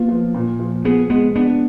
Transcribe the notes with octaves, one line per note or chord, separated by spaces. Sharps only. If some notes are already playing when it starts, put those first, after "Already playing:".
Already playing: A#3 B3 F4
F3
A#2
F3
B3 G#4
G#3 B3
B3 D4